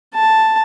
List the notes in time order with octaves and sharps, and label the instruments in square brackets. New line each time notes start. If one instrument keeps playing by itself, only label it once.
[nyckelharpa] A5